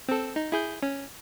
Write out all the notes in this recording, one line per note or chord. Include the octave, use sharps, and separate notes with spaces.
C4 A4
D#4
E4 G#4 G6
C#4